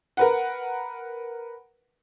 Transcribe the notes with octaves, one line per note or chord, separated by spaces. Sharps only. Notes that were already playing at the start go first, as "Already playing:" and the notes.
A#4 B4 F#5